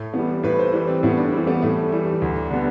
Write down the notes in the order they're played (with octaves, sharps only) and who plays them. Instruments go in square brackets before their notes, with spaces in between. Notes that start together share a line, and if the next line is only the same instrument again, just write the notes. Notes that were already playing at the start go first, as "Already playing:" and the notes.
Already playing: [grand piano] A2
[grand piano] E3 G3 [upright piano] B3
[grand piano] A2 [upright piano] B4
[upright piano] C5
[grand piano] E3 G3 [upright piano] B4
[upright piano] C4
[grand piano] A2 [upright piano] B3
[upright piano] D4
[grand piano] E3 G3 [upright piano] C4
[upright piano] B3
[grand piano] A2 [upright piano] A3
[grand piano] E3 G3
D2
D3 G3 B3